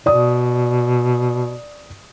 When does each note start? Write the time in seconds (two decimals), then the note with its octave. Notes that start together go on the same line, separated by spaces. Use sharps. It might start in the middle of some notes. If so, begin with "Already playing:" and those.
0.06 B2 D5 D#6